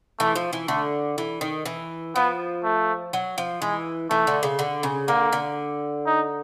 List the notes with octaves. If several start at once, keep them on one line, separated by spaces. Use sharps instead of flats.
E3 A3
F3
E3
D3 A3
E3
D#3
E3
F3 B3
A3
F#3
F3
E3 G#3
E3 A3
D3
C#3
D3
C#3
D3 A#3
D3
D#4